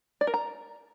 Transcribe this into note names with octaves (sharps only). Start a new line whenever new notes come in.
D5
A#4
A#5